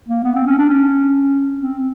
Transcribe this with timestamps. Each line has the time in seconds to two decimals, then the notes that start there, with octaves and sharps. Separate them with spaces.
0.08 A#3
0.24 B3
0.35 C4
0.47 C#4
0.58 D4
0.69 C#4
1.60 C4